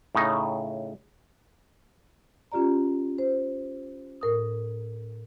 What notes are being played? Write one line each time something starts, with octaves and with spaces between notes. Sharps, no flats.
A2 C#3 D#4
C#4 F4 G4 D5 A#5
C5
A2 A#4 D#6